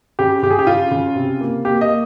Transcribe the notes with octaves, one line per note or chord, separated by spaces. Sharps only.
C#3 G4
C#3 G4
G#4
G4
C#3 F4
C#3
C3
A#3
A#3 G4
D#5
A#3